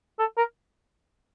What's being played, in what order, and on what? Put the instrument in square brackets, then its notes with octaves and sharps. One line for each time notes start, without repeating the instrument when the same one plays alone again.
[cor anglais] A4
A#4